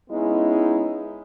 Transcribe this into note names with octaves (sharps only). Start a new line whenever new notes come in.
G#3 B3 C#4 D#4 E4